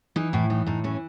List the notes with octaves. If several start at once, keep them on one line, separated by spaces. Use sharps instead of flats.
E3 D#4
A2 E4
E3 D#4
A2 D#4
E3 C#4